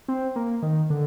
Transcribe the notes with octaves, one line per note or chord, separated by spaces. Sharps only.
C4
A#3
D#3
D3